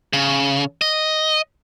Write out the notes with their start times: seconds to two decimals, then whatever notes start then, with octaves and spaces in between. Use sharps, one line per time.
0.13 C#3
0.81 D#5